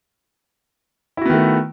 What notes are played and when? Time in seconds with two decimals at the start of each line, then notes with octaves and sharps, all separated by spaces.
1.17 E4
1.21 F#4
1.26 B3
1.30 D#3
1.34 A3